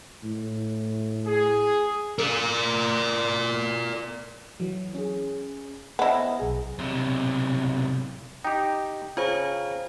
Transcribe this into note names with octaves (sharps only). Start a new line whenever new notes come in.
A2
G#4
A#4 D5
E3 F#3
C#4 G#4
B3 E4 C5 D#5 A#5
B1 G#4
B1 C3
D#4 G4 G5
C#3 F4 C5 F5